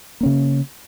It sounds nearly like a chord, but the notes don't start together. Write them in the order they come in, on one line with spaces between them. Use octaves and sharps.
A#3 C#4 C#3